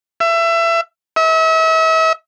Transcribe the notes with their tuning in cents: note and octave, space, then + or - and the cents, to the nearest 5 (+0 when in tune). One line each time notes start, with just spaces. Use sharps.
E5 +25
E5 -40